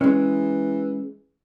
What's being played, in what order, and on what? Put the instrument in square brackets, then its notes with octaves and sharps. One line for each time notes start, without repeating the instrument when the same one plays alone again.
[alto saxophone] E3 [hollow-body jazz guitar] G#3 C#4